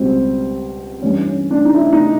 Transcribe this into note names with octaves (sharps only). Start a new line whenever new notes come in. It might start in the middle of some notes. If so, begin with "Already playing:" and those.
Already playing: C#2 B2 G3 C4
G2 E3 G3 C#4
C#4
D4
D#4
E4
D#4